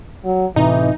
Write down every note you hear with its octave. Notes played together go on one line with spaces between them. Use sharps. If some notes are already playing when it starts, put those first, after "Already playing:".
F#3
A2 C3 E3 D#4